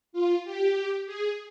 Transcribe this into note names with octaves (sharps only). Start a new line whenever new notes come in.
F4
G4
G#4